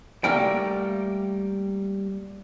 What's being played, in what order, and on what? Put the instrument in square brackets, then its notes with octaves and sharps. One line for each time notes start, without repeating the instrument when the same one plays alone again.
[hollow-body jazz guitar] G3 A3 A#3 G5